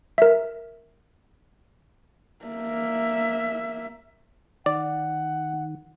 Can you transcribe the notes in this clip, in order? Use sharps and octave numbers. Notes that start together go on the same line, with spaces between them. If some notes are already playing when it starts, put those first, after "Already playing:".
A#4 E5
A#3 E5
D#3 D5 F#5